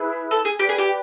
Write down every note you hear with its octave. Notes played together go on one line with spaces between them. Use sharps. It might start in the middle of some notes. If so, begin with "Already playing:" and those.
Already playing: E4 G#4 B4 E5
A4
G#4
G4 B4 D5 G5
G#4
G4